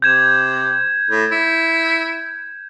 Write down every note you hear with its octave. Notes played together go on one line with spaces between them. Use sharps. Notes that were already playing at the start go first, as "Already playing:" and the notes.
C3 G6 G#6 E7
A2
E4